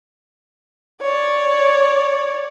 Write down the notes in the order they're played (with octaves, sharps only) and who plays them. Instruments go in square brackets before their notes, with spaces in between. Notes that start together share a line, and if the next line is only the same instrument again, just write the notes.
[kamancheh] C#5 D5